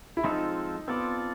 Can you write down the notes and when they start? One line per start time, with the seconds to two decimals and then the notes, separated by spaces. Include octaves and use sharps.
0.17 E4
0.24 F3 G#3 C4 D#4 F4 A4
0.88 B3 C4 F4 A4 D5